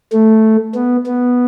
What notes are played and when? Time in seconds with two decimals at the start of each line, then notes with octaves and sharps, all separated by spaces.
0.13 A3
0.75 B3
1.06 B3